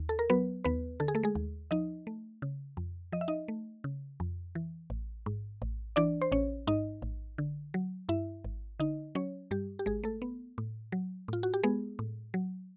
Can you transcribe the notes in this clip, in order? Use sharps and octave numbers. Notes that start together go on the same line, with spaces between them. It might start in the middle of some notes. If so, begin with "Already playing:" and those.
Already playing: D#2
A4
A#4
F#3 B3 B4
D#2 B3 B4
D3 A4
G#4
A3 A4
G#3 G#4
D#2
F3 D#4 D#5
A3
C#3
F2
F3 D#5
E5
D#4 D#5
A3
C#3
F2
E3
A1
G#2
A1
E3 D4 D5
C5
A1 C#4 C#5
G#2 D#4 D#5
A1
D3
F#3
G2 E4 E5
G#1
D3 D#4 D#5
F#3 C#4 C#5
G2 G3 G4
G4
G#1 G#3 G#4
A3 A4
B3
A2
F#3
A2 F4
F#4
G4
G#3 B3 G#4
A2
F#3